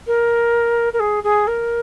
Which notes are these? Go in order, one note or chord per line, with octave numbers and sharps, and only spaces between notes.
A#4
A#4
G#4
G#4
A#4